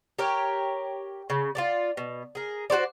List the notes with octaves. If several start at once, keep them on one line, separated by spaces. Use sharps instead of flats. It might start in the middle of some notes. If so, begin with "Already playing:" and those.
G4 A#4 C#5
C#3
F4 G4 D5
B2
G#4 A#4
F#4 G4 C5 D5